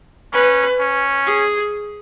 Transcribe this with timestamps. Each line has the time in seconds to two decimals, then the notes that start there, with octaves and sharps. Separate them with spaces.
0.33 C#4 B4
0.79 C#4
1.26 G#4